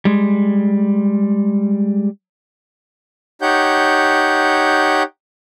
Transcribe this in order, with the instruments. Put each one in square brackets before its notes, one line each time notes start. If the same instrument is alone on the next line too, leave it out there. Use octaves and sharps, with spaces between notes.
[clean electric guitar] G3 G#3
[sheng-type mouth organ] D#4 G4 C#5 F#5 G6